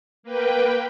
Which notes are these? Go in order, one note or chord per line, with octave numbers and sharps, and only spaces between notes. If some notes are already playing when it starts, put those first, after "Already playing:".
A#3 B4 G5